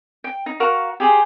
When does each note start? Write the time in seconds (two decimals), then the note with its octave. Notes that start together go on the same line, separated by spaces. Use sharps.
0.24 G5
0.46 D#4
0.60 F#4 A#4 F5 C#6
1.00 G4 G#4 C5